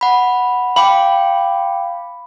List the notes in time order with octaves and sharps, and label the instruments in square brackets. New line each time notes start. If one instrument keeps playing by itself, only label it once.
[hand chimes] F#5 B5
[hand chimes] F5 G5 D6 [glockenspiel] B5